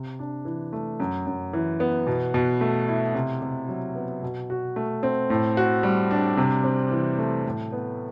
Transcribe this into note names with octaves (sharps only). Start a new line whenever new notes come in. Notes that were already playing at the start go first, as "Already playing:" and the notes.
Already playing: C3
D4
E3
A3
F#2
F#2
E3
B3
B2
B2
A3
E4
C3
C3
F#3
B3
B2
F#4
A3
C4
A2
F#4
G3
D4
C3
C4
E3
A3
A2
B3